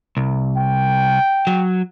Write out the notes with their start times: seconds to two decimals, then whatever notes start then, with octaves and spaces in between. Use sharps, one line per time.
0.17 C2
0.57 G5
1.47 F#3